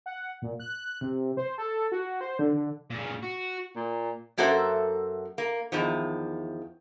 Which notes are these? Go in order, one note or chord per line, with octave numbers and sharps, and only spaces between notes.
F#5
A#2
F#6
C3
C5
A4
F#4
C5
D3
D3
A#2 C#3
F#4
A#2
F#2 A#3 F#4 A4 C5 E5
A#3
E2 D#3 F3